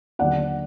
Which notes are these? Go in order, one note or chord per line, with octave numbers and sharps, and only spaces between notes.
D#2 D3 F#3 D5 F#5